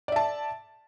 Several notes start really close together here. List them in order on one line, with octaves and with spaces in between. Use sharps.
D5 E5 A5